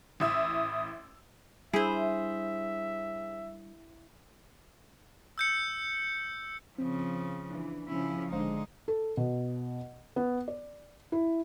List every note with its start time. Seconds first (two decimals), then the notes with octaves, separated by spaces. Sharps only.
0.20 A1 E4 D#6 E6
1.73 G3 D4 E4 G#4 C5 E5
5.38 E6 G6 C#7
6.78 C#3 F3 C4
7.50 E3 D4
7.88 C#3 F3 C#4 E4
8.32 G#1 D3 G#3 D#4 C5 F5
8.88 A4
9.17 B2
10.16 B3
10.48 D5
11.12 E4